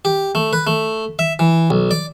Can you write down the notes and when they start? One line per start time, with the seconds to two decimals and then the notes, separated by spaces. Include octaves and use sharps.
0.05 G4
0.35 A3
0.53 B4
0.67 A3
1.19 E5
1.39 E3
1.70 B1
1.91 D5